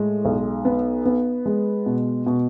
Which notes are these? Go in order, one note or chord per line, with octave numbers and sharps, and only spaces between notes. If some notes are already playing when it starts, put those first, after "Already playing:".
Already playing: A2 G#3
B1
B3
B3
G#3
B2
B2